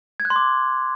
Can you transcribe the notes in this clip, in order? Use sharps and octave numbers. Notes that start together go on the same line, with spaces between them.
G#6
F#6
C6
D6